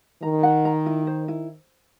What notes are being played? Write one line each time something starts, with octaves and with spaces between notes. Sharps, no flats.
D#3 A#5
F#5
A#5
E4
C5
E4